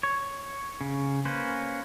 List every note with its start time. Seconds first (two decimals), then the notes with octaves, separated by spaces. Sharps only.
0.03 C#5
0.81 C#3
1.25 A#3 C#4 B4 C5